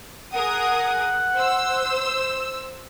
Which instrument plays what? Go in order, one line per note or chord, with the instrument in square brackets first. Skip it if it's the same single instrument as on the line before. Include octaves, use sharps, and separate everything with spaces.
[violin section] G#4 A#4 D#6 [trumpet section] F#5
[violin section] C5 E6